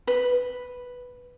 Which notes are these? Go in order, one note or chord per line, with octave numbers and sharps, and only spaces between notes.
B4